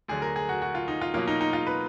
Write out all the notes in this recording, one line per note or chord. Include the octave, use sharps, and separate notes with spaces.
D2 D3 F#3 G#4
A#4
G#4
F#4
F#4
F4
D#4
F4
B2 F#3 A#3 F4
D#4
D#4
F4
B4